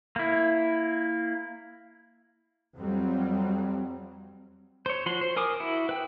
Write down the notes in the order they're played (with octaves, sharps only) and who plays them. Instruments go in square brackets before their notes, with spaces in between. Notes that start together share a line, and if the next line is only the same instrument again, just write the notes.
[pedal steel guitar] A#3 E4
[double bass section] F2 F#3 G3 C4
[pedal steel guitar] C5 C#5
F3 F#4 C6
C5
A#4 G#5 D6 D#6
E4 F#4
B4 G5